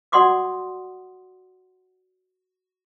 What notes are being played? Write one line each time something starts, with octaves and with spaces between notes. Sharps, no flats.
F#4 D5 F#5 C6 D6 D#6